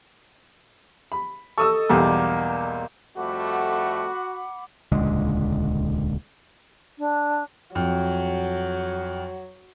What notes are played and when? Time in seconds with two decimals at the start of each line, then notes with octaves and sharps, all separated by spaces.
1.12 B5
1.58 A4 D#5 C#6 D#6 E6
1.89 B1 E2 G3 A#3 D5
3.17 F2 G3 A3 F#4 F#5 B5 D6
4.92 D#1 C#2 D3 G#3
6.98 D4
7.75 F2 F#3